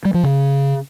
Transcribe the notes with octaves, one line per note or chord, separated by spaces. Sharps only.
G3
F3
C#3